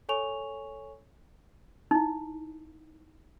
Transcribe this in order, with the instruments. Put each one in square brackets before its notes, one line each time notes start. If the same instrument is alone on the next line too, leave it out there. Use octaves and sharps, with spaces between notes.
[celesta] A4 C#5 G#5 C#6 F7
[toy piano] D#4 E4